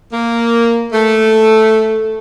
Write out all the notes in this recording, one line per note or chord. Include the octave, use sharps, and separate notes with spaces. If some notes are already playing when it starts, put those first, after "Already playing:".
A#3
A3